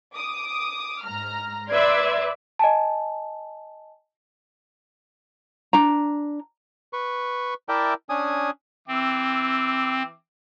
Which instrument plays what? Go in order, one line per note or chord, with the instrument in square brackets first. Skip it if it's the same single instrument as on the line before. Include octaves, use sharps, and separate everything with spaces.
[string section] D6 D#6
G#2 A#5 F6
[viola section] B4 D5 E5 [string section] C6 G#6
[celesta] D#5 G#5 A5
[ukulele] D4 A#5
[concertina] B4 C#6
E4 A#4 D5 E5 G5 A5
C#4 D4 G#5 D#6
[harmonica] E3 E5 D6 [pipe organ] C4